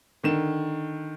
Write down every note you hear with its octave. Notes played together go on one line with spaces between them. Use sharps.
D3 D#3 E7